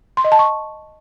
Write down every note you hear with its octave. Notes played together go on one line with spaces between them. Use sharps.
C6
D#5
A5
C#6